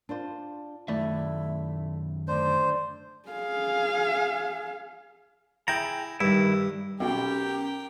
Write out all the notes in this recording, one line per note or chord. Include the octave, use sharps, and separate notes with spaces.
D4 F4 C5
F#2 D#3 A3 E4 D5 E5
D3 A3 D4 C5 D5
G#4 F5
E4 G#4 G5 A#5
G2 D#3 E4
B1 B2 C#4 G4 A#4 G5